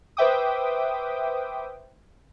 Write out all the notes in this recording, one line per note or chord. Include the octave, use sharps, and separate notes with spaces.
B4 C5 E5 G5 D6 D#6